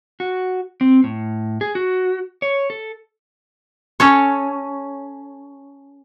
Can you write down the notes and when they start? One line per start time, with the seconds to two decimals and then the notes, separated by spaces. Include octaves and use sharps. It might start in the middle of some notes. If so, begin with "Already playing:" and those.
0.20 F#4
0.81 C4
1.04 A2
1.61 G#4
1.75 F#4
2.42 C#5
2.70 A4
4.00 C#4 A4 C#5